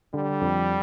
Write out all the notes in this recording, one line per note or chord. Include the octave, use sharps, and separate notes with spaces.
D3 G3
F2